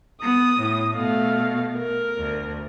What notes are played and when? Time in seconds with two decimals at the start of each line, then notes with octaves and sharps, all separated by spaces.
0.22 B3 D#6
0.59 A2
0.97 B2 A3 F5
1.77 A#4
2.18 D2